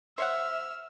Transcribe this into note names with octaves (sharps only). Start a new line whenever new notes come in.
C5 C#5 E5 F#5 E6 F6